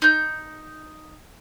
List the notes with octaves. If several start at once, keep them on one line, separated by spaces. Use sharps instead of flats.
D#4 G6